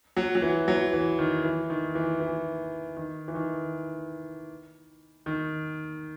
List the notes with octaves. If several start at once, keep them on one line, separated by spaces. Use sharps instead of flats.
F#3
F#3
E3
F#3
E3
D#3
E3
D#3
E3
E3
D#3
E3
D#3
D#3